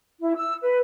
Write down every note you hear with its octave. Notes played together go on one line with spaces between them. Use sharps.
E4
E6
B4